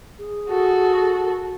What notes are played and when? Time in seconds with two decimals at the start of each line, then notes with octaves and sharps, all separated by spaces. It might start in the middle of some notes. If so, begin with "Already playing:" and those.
0.19 G#4
0.48 F#4 A4